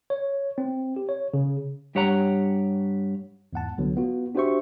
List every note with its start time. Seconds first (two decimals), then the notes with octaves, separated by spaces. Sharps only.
0.10 C#5
0.58 C4
0.96 G4
1.09 C#5
1.34 C#3
1.95 G2 G4 C#5 F#5 A#5
3.53 E2 G#2 F#5 A5
3.78 C2 D3 F#3 B3
3.96 B3 F4 F#4
4.35 D4 F#4 G4 C5 E5 C#6